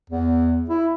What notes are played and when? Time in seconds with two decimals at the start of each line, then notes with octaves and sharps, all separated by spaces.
0.10 E2
0.69 E4